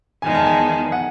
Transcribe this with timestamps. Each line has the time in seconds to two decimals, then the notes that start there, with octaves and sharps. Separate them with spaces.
0.22 E2 D#3 G#3 G#5
0.35 A5
0.46 G#5
0.92 F#5